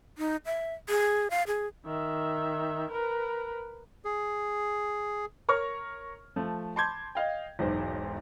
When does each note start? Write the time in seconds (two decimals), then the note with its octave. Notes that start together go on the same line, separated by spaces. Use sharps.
0.18 D#4
0.46 E5
0.89 G#4
1.30 F5
1.47 G#4
1.85 D#3 E5
2.91 A#4 B4
4.05 G#4
5.49 A#4 C#5 C#6 F6
6.36 F3 A3
6.76 A5 B5 C6 D6 G6 G#6
7.15 D#5 F5 G5
7.59 E1 B1 G#2 C5